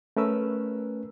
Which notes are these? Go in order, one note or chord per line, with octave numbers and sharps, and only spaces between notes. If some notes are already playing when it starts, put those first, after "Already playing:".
A3 C#4 A#4 B4 E6